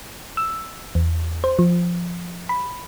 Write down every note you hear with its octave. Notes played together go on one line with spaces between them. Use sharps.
E6
E2
C5
F3
B5